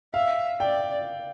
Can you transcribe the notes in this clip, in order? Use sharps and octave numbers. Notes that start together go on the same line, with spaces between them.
E5 F5
D5 G5